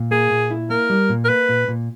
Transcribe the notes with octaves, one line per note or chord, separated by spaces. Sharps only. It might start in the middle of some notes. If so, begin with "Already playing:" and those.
Already playing: A#2
A#3 G#4
A#2
E4
A#3 A#4
G3
A#2
A#4
A#3 B4
A#2
A#2